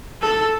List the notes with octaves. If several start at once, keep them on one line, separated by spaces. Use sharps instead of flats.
A4